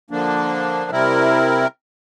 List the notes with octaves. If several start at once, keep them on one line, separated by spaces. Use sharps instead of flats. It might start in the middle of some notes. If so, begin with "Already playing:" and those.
D3 F3 A#3 D4
C3 G3 C4 E4 A#4